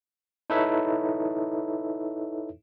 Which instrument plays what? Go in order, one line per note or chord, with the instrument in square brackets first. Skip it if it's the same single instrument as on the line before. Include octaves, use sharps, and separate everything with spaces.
[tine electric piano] D#4 E4 A4 B4 C#5 E5